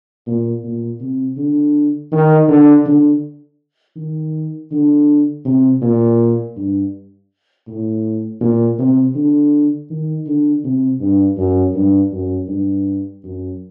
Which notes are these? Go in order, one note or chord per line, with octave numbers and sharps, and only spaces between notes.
A#2
A#2
C3
D3
D#3
D3
D3
D#3
D3
C3
A#2
G2
A2
A#2
C3
D3
D#3
D3
C3
G2
F#2
G2
F#2
G2
F#2